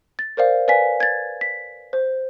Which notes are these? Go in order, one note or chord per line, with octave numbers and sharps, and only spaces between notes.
A6
A#4 C5 D5 F5
B4 D5 F5 G#5 B6
G#6 A6
B6
C5